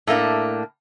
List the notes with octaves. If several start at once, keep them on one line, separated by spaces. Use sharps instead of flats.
A2 A3 A#3 D4